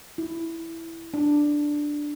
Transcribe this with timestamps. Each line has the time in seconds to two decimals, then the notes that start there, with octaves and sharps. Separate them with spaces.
0.18 E4
1.14 D4